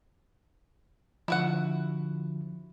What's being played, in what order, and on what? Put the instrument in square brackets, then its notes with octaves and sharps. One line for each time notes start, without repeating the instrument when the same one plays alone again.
[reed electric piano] D3 F3 [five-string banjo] E4 F#4 F#5